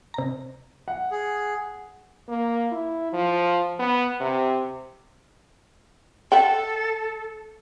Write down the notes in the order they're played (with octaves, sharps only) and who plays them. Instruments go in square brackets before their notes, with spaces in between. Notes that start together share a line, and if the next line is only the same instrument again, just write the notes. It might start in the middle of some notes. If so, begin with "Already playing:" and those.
[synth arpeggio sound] C3 A#5
[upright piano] F#5
[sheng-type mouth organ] G#4
[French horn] A#3
E4
F3
B3
C3
[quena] A4 [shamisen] E5 F#5 G5